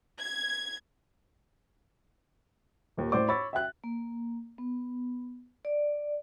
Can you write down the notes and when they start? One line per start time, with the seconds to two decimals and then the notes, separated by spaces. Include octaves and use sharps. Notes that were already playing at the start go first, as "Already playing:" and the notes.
0.20 G#6
2.97 D#1 D#2
3.12 A2 C5 D5 D6
3.28 C#5 B5 C#6 D6 E6 A6
3.53 E5 G5 F#6
3.84 A#3
4.58 B3
5.65 D5